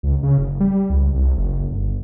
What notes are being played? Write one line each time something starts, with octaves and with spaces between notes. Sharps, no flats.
C#2
C#3
F#1
G3
C#2
C2
F#1
G1